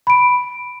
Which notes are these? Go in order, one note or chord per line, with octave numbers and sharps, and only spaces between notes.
B5 D7